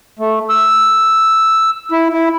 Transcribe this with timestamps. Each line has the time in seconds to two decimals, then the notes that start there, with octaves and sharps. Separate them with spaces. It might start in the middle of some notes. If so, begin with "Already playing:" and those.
0.19 A3
0.50 E6
1.92 E4
2.13 E4